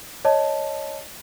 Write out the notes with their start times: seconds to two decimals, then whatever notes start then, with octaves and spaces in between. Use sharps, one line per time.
0.25 C#5 D#5 A5